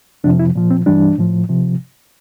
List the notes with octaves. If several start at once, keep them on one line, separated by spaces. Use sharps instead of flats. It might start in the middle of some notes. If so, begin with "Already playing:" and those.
F2 C3 F3 D4
E4
A#2 F3
C4
G2 E3 G3 D4
A2 F3
C3 F3